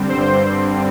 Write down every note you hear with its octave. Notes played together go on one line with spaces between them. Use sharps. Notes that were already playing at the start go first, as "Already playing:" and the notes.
Already playing: G2 D3 G3 C4
C5